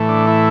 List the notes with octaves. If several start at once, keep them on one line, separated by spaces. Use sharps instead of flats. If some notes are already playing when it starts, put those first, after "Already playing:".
Already playing: A2 E3 A3
D4
E4